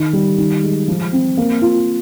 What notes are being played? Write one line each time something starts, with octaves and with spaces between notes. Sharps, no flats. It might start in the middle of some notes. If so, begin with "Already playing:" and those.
Already playing: D#3
G3
D#3
G#3
F3
C4
A#3
F4